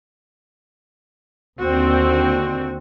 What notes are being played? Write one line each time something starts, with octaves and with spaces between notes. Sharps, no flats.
D#2 D3 C4 F#4